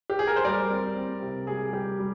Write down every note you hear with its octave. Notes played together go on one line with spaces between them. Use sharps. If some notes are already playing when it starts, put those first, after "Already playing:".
G4
G#4
A#4
C5
G3 A#4 D5
C4
C4
C3
G3 G#4
G3 G4
G3